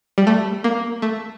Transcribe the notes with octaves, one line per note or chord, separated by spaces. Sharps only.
G3
A3
A#3
A3